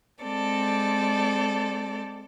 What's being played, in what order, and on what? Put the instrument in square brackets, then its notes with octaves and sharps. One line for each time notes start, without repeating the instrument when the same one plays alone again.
[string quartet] G#3 C4 A4 D5